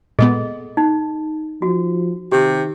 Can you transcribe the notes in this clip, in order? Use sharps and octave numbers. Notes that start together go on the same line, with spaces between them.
A#2 G#3 B3 G#4 A4 D#5
D#4
F3 F#4
C3 D#3 G4